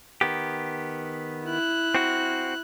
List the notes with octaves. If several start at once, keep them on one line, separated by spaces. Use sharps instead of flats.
D#3 B3 G4
E4 F#6
C4 F#4